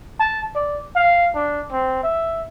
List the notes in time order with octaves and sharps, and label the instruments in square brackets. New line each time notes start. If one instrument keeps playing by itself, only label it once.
[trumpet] A5
D5
F5
D4
C4
E5